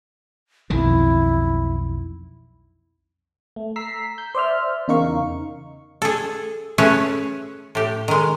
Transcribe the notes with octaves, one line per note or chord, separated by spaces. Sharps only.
B1 F2 D#3 E4
A3
A#5 E6 B6 C7
G6
C5 D5 E5 F6
E2 C#3 D#4 A#4 F5 C#6
G#4 A4
A3 C#4 G#4 B4 C#5 E5
A2 G4
D#3 G#3